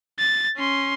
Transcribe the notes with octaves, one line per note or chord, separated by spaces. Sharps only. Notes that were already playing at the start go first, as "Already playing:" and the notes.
A6
C#4 C6